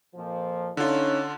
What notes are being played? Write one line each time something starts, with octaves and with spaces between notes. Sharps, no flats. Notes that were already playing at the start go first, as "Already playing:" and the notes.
F2 A#2 F3
D3 C#4 D#4 F4